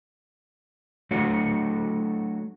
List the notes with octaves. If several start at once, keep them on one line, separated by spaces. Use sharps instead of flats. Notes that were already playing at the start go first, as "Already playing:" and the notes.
F#3 A3 D4 F#4 A4 C#5